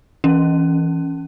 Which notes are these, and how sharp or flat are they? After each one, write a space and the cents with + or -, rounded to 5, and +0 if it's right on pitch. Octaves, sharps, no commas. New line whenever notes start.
E3 -5 C#4 -5